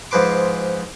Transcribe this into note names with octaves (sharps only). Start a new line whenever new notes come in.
G#2 F3 G#4 B4 C6 D6